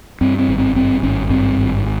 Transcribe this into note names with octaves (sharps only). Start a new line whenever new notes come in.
G2 C4
C4
G#1
C4
G2 C4
G#1 C#4
G2 C4
G#1